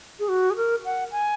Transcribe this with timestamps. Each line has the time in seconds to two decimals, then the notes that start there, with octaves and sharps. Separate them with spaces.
0.20 G#4
0.29 F#4
0.50 G#4
0.56 A#4
0.85 F#5
1.12 G#5